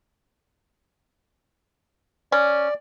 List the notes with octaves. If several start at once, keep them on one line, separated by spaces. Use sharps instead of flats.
C#4 D5